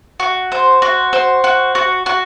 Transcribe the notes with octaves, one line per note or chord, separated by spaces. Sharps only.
F#4
C5
F#4
C5
F#4
F#4
F#4